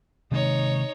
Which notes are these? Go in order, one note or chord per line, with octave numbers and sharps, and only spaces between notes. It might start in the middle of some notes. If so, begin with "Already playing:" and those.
C3 D#3 G#3 D#4 C#5